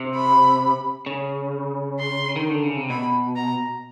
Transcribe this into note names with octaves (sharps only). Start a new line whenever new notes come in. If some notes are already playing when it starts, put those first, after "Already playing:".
Already playing: C3
B5
C#3
C6
D#3
D3
C#3
C3
B2 B5
A#5